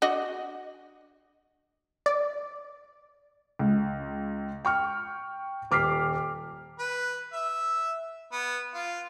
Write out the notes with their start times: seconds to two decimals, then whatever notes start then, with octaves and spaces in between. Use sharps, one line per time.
0.02 D4 F#4 D#5
2.06 D5
3.59 C#2
4.65 G5 C#6 F6
5.71 D#1 D6 F6 B6 C7
6.79 B4
7.33 E5
8.32 B3
8.74 F4